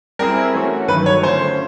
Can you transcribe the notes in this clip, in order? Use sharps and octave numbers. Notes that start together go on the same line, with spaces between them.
G3 C4 E4 G#4 A#4
E3 A3 C#4 F#4
G2 D#3 F#3 A3 B4
C#5
D3 F3 A3 C#4 E4 C5